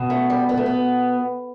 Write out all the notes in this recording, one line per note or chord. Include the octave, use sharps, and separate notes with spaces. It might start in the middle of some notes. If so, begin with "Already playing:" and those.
Already playing: B2
A3
G3
B3
A3
B3